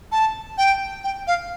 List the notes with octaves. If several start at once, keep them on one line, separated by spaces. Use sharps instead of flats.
A5
G5
G5
F5